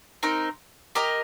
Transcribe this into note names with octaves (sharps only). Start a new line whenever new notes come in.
C4 D#4 A#4
G4 A#4 D#5